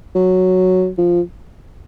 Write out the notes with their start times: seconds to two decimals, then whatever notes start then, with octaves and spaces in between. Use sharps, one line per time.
0.15 F#3
0.98 F3